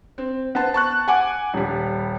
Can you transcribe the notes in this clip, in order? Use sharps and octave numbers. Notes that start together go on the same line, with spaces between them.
C4
B3 C5 A5
A5 C#6 F#6
F#5 G#5 D6
D#1 G3